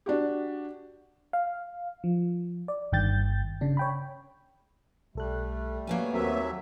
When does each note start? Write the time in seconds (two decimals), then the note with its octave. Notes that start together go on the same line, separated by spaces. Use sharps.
0.06 D4 F#4 G4
1.33 F5
2.04 F3
2.68 D5
2.92 G1 G2 D#3 G5 G6 A6
3.61 C#3 D4
3.77 C#5 G5 B5
5.15 B1 G3 A3 A4 F#6
5.87 F#3 A#3 B3 G#5
6.14 D#2 F#3 C4 F#4 A#4 E5